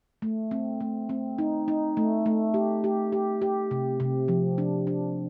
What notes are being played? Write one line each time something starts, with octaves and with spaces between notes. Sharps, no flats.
A3
C4
A3
C4
D#4
D#4
A3
A3
G4
G4
G4
G4
C3
C3
F3
D4
D4